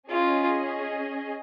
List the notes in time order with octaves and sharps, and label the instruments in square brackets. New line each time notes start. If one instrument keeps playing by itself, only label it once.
[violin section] C#4 G#4 D#5 [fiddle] F4